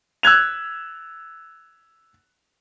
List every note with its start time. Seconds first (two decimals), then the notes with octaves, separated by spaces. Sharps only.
0.23 E6 F#6 G#6 F7